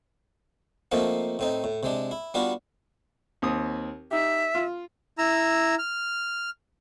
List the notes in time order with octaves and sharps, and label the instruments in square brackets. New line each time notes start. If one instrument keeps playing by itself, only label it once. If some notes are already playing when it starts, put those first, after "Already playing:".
[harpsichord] F3 A3 A#3 C4 D#4
A2 C4 D#4
A2
C3 G#3 D4
E4
G3 B3 D4 F4 F#4
[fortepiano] D#2 C4 D#6
[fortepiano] D#4 G4 [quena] E5
[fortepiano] F4
[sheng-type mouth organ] E4 A#5 E6
F6